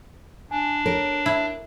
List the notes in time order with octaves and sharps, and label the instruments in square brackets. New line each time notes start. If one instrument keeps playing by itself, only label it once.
[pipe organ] D4 [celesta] G#5
[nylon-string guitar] A#4 [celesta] C#5
[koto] E4